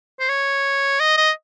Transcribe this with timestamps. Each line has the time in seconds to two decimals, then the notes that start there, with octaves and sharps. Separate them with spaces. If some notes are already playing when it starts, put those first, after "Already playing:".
0.20 C5
0.29 C#5
1.00 D#5
1.17 D#5